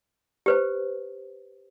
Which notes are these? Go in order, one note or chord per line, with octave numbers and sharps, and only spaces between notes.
G4 B4 C5